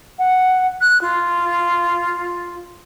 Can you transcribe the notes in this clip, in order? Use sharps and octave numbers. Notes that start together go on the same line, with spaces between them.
F#5
F#6
F4